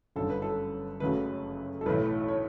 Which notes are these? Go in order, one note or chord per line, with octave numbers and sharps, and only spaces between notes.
G1 F#2 D3 A4
B4
A4
F#1 F#2 C#3 F#3 A3 B4
A4
B1 A2 E3 A3 B4
C#5